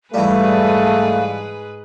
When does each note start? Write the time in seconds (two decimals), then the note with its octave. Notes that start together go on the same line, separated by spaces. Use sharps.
0.14 G#2 E3 G3 A3 G#4 B4 F5